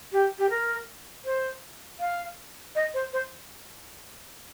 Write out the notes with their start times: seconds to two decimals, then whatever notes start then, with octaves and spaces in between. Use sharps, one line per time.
0.12 G4
0.38 G4
0.50 A#4
1.25 C5
2.00 F5
2.75 D#5
2.94 C5
3.13 C5